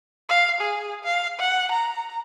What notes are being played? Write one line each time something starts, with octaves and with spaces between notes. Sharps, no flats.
F5
G#4
F5
F#5
A#5